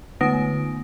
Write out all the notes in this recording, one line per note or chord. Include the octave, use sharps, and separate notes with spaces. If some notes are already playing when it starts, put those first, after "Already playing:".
D3 A3 B3 D#6 A#6 D7